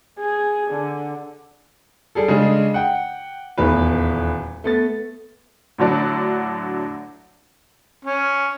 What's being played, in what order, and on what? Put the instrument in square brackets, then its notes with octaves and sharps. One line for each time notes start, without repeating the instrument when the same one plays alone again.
[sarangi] G#4
D3
[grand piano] G3 G#4 A4
C#3 G#3 D4 G#4
F#5 G5
D#1 E2 B4
A3 B3 A6
[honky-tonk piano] A2 D3 F#3 D4
[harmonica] C#4